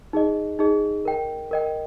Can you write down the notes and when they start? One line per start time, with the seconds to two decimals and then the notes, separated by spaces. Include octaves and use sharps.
0.13 D#4 G#4 D#5
0.59 D#4 G#4 D#5
1.05 A#4 D#5 G5
1.51 A#4 D#5 G5